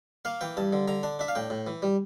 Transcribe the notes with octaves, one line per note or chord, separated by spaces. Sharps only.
A#3 F5
E3 G5
G2 A5
D3
D3 A#5
D4 A5
D4 E5
F5
A2 G5
A2
E3
G3